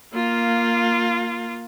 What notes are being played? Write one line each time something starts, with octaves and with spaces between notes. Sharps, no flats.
A#3 F4